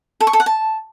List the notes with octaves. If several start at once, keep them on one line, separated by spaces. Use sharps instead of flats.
A4
C#6
A4
F#5
A5